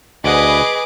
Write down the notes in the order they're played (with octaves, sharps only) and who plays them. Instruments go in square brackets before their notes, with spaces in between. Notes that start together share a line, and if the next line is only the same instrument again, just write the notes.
[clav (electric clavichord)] D2 F#5 [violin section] G#4 B4 [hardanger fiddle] D#5 [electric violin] D6